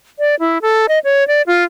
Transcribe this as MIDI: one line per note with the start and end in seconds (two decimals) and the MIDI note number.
0.19 0.35 74
0.40 0.58 64
0.62 0.86 69
0.88 0.99 75
1.04 1.27 73
1.28 1.42 74
1.47 1.64 65